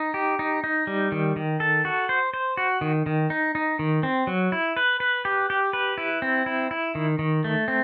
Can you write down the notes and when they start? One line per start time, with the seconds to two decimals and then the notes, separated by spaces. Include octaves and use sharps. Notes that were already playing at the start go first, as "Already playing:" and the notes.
Already playing: D#4
0.14 G4
0.39 D#4
0.64 D#4
0.87 G3
1.12 D#3
1.36 D#3
1.60 A4
1.85 F#4
2.09 C5
2.34 C5
2.57 F#4
2.81 D#3
3.06 D#3
3.30 D#4
3.55 D#4
3.79 D#3
4.03 C4
4.27 F#3
4.52 E4
4.77 B4
5.00 B4
5.25 G4
5.50 G4
5.73 B4
5.98 E4
6.22 C4
6.46 E4
6.71 E4
6.95 D#3
7.19 D#3
7.44 A3
7.68 C4